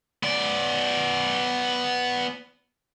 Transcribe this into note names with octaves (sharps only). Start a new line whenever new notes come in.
B3 D5